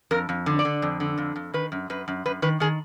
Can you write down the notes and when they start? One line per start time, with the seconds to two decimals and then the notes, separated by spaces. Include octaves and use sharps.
0.11 F2 A#4
0.29 F2
0.46 D3
0.59 D5
0.65 D3
0.82 F2
1.00 D3
1.18 F2
1.36 F2
1.54 D#3 B4
1.72 F#2
1.90 F#2 B4
2.08 F#2
2.26 F#2 B4
2.42 D#3 B4
2.60 D#3 G#4